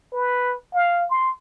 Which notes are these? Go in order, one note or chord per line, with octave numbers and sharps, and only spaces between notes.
B4
F5
C6